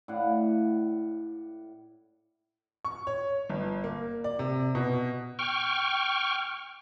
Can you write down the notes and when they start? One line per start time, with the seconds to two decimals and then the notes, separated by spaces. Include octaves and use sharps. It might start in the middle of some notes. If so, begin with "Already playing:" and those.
0.08 A2 D5 F5 F#5
2.85 C#6
3.07 C#5
3.50 G1
3.84 A#3
4.24 D5
4.39 C3
4.75 B2
5.39 G5 C#6 F6